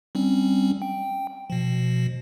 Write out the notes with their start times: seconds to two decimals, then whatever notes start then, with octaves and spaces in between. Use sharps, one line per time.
0.15 G3 C4 C#4
0.82 G5
1.50 B2 F3